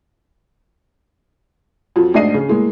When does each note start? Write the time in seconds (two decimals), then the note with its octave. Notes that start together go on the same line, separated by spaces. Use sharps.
1.96 F2 F3 F#3
2.14 D2 G#2 D4 D#5 C7 D#7
2.34 C#3
2.49 A2 G#3 A#3